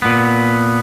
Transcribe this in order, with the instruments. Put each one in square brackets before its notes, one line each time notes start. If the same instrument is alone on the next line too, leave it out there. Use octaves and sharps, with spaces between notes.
[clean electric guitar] A#2 B3